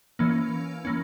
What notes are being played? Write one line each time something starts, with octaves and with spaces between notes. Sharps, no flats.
E3 A#3 C#4
E3 A#3 C#4